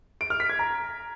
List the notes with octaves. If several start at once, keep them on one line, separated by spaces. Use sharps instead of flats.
D7
F6
B6
G#6
A#5